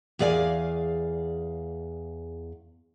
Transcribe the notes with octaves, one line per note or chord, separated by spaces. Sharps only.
E2 G#4 D5 F5 G#5